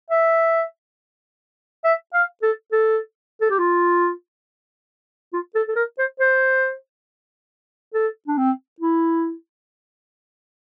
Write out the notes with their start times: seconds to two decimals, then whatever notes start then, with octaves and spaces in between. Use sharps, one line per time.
0.10 E5
1.84 E5
2.14 F5
2.42 A4
2.72 A4
3.41 A4
3.50 G4
3.59 F4
5.33 F4
5.55 A4
5.68 A4
5.76 A#4
5.99 C5
6.20 C5
7.94 A4
8.28 D4
8.38 C4
8.81 E4